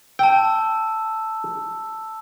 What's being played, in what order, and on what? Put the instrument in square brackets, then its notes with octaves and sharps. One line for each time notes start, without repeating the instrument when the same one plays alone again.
[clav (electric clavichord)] G5 [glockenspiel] A5 E6